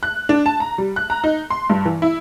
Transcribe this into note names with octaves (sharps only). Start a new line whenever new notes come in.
F#6
D4
A5
A#5
G3
F#6
A#5
D#4
C6
G2
E3
E4